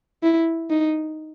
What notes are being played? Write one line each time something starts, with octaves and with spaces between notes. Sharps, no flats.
E4
D#4